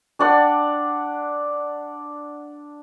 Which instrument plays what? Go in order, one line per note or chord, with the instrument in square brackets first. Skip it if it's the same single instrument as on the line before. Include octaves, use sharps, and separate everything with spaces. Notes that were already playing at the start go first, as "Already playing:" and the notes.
[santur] D4 D5 F#5